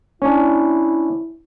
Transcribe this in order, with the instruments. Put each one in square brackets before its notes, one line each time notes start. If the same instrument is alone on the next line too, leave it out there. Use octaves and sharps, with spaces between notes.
[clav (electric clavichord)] C#4 D4 [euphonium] E4